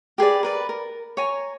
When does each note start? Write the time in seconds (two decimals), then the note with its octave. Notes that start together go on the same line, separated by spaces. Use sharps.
0.18 G4 G#4 B4 D5
0.43 A#4 B4 D5
0.69 A#4
1.17 C#5 G#5 A#5